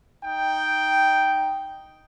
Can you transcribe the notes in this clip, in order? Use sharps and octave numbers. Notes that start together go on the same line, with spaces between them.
D#4 G5